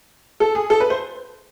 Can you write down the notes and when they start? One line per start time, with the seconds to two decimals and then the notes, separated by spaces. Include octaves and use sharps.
0.40 A4
0.55 G#4
0.70 A4
0.80 B4
0.90 C5